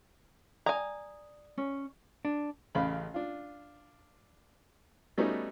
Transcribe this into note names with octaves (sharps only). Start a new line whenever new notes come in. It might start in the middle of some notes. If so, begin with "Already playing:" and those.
D5 G#5 A#5 D#6
C#4
D4
A1 C#3 F5 B5
D4 F4
G3 A3 B3 C#4 D#4 F#4